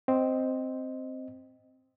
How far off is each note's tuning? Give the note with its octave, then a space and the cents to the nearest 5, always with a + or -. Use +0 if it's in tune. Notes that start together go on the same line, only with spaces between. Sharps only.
C4 +0 D#5 +0